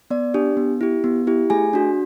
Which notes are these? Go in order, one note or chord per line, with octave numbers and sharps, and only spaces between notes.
B3 D5
D4 G4
B3
E4 G4
B3
E4 G4
A3 G#4 G#5
D4 F#4